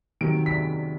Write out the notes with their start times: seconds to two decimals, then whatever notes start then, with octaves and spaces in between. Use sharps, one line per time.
0.21 C3 D#3 F#3 D7
0.46 B6